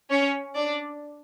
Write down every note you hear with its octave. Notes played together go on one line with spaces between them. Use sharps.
C#4 C#5
D4 D5